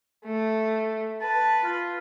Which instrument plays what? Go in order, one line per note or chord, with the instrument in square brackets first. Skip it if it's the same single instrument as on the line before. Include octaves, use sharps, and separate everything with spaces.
[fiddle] A3
[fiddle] B4 [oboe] A5
[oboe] F4